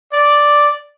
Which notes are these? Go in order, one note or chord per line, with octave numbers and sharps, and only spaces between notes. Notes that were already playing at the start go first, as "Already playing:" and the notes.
D5